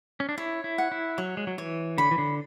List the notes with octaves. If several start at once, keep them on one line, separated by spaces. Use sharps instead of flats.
C#4
D4
E4 C#5
E4
F#5
E4
F#3 C#5
G#3
F#3
E3 C#5
D3 B5
E3
D3